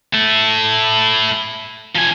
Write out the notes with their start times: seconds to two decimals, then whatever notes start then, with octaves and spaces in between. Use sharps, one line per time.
0.14 A3 E4
1.96 F3 G#5